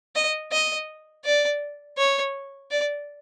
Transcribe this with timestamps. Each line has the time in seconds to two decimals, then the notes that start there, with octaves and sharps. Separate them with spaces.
0.16 D#5
0.52 D#5
1.25 D5
1.98 C#5
2.71 D5